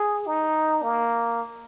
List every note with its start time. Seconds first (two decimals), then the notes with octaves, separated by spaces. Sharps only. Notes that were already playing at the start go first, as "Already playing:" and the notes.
Already playing: G#4
0.27 D#4
0.83 A#3